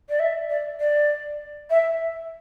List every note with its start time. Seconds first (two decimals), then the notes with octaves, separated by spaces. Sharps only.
0.09 D5
0.19 E5
0.49 D5
0.80 D5
1.70 E5